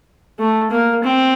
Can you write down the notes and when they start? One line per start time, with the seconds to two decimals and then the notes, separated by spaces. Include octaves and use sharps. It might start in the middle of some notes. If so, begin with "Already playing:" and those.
0.39 A3
0.71 A#3
1.04 C4